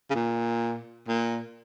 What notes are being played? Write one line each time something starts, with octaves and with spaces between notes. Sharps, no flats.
C#3
A#2
A#2